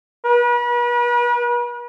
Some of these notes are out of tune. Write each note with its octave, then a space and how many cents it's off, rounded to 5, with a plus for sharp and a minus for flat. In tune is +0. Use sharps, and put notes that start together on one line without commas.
B4 -40